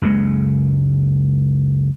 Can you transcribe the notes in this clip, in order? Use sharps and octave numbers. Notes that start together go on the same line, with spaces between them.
F#1 C#2 C#3 G#3